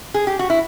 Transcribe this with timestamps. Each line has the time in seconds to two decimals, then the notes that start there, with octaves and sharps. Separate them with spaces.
0.14 G#4
0.27 G4
0.39 F#4
0.50 E4